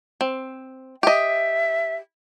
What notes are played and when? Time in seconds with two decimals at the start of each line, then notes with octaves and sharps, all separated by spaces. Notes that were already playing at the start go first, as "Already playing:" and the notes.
0.21 C4
1.03 G4 D#5 E5